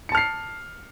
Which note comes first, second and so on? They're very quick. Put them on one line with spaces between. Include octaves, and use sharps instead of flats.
C#7 A5 F6 C7